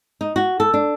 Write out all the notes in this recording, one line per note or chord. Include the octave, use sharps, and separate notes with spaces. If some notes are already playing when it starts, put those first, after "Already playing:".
D#4
F#4
A4
D4